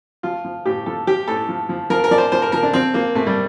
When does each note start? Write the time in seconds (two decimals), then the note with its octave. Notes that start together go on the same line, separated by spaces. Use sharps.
0.23 F3 F4
0.45 F3
0.66 A2 G4
0.86 F3 A4
1.07 F3 G4
1.27 A2 A4
1.49 F3
1.69 F3
1.90 F3 A#4
2.04 A#4
2.11 F3 D5
2.18 C5
2.32 F3 C5
2.42 A#4
2.52 F3 A#4
2.63 D4
2.73 F3 C4
2.94 F3 A#3
3.15 C3 A3
3.27 G3